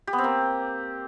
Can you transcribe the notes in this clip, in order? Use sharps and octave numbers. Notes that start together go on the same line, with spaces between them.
G4
B3
C4
A#3